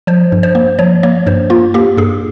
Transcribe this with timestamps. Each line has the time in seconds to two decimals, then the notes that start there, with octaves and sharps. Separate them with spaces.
0.07 F3 C5
0.32 G2
0.43 C5
0.55 A#3
0.79 F3 C#5
1.03 A#3 C#5
1.26 G2 C5
1.50 A#3 F4
1.74 A#3 G4
1.97 G2 G#4